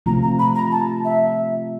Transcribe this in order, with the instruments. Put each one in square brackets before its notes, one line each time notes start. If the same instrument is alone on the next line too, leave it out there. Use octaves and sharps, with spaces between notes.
[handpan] C3 F3 A3 C4 F4 [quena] A#5
[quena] A#5
B5
A#5
A5
E5